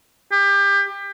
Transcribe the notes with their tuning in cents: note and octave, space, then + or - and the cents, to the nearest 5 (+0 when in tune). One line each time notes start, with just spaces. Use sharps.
G4 +25